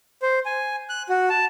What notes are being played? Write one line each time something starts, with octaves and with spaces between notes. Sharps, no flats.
C5
G#5
F#6
F#4
A5